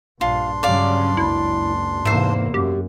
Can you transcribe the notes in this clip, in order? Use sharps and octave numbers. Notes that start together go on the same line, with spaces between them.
A#1 G2 D4 F4 C6
G2 C#3 F#3 D5 F5
F#1 C#2 E4
E2 G#2 C3 A#3 C5 E5
F#2 G4